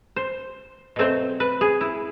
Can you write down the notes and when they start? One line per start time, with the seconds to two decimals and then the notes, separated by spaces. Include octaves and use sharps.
0.16 C5
0.96 B2 F#3 A3 C4 C5
1.40 B4
1.61 G#4
1.81 E4